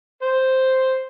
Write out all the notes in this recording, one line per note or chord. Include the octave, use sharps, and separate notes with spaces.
C5